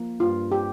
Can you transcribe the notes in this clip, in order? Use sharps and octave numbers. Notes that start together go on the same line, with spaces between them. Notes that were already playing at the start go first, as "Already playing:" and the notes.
Already playing: F3 A#3
G2 F4
G4